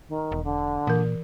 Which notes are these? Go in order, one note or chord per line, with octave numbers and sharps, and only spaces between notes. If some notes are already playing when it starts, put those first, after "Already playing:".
D#3
E1
D3
A#2 E3 A#4